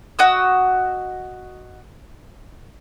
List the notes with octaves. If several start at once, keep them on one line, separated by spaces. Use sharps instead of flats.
F#4 D#5 E6